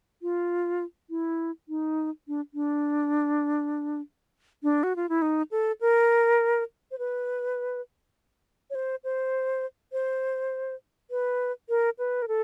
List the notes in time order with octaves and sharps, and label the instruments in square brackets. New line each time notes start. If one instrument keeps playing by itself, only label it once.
[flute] F4
E4
D#4
D4
D4
D4
F#4
F4
E4
D#4
A4
A#4
C5
B4
C#5
C5
C5
C5
B4
A#4
B4
A#4
A4